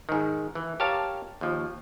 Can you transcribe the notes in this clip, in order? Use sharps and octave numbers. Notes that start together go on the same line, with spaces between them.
G#2 D#3
E3
G4 A#4 C#5 F5 A5
D#2 F3